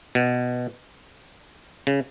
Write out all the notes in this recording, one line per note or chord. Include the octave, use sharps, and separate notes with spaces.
B2
C#3